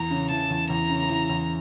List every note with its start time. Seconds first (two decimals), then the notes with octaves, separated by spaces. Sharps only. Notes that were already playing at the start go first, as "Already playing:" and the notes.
Already playing: E2 A#5
0.10 C#3
0.30 E3 A5
0.50 E2
0.70 E2 A#5
0.90 C#3
1.09 E3
1.29 E2